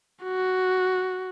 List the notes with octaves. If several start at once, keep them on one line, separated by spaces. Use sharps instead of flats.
F#4